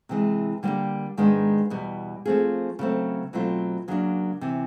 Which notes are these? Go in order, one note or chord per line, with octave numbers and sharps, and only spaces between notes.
C3 E3 G#3
D3 G3 A#3 D4 G4
G#2 D#3 G#3 B3 D4
E2 B2 G3 B3
F3 A3 C4 F4 G#4
C#3 F#3 A3 C4
B2 F#3 A3 C4 F4
C#3 F#3 A#3 D4
C3 E3